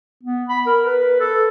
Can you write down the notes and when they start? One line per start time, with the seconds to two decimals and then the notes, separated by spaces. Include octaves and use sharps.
0.23 B3
0.49 B5
0.67 A#4
0.86 B4
1.20 A4